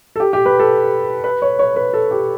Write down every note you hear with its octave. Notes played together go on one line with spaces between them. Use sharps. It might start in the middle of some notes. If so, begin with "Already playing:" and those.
A4
G4
G4
B4
A4
B4
C#5
C#5
B4
A4
G4